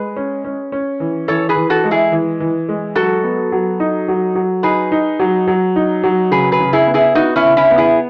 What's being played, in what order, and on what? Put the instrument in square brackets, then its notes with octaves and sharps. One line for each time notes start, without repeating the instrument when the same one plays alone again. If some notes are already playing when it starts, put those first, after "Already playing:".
Already playing: [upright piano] G#3 [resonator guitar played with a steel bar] G#4 B4
[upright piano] C#4
C#4
C#4
E3
[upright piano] E3 [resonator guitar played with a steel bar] A4 C#5
[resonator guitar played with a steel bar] G#4 B4
[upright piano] E3
[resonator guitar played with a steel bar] F#4 A4
[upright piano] G#3
[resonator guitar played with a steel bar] E4 G#4
[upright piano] E3
E3
G#3
[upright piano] F#3 [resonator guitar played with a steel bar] F#4 A4
[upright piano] B3
F#3
D#4
F#3
F#3
[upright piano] D#4 [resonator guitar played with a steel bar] G#4 B4
[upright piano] D#4
F#3
F#3
D#4
F#3
[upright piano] C#3 [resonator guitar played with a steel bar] G#4 B4
[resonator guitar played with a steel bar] G#4 B4
[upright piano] C#3
[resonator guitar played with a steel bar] E4 G#4
[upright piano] B3
[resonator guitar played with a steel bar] E4 G#4
[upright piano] B3 [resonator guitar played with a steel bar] D#4 F#4
[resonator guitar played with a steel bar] C#4 E4
[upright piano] C#3
[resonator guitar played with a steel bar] C#4 E4
[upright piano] B3
[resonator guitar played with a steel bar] E4 G#4